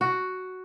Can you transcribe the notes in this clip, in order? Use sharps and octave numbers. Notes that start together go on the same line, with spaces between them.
F#4